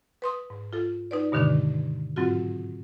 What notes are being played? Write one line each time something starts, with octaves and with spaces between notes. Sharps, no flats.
B4 C6 D#6
G#2
F4 A4
D#4 B4 D5
G2 B2 D3 D#3 G#3 D4
G#2 F#3 C4 F4 F#4